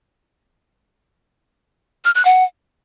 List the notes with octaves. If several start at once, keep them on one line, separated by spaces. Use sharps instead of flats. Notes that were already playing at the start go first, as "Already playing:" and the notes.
F6
F#6
F#5